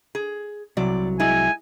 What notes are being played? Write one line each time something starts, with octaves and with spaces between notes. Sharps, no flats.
G#4
C2 C3 F#3 D5
G#3 E4 G#4 G#5